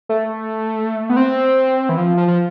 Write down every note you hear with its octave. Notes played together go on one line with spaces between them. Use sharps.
A3
B3
C4
E3
F3
F3
F3